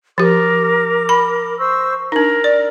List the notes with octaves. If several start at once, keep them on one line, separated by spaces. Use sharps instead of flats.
F3 G4 A#4 D6
B5
C5 C#6 E6
D4 D#4 A#4
D5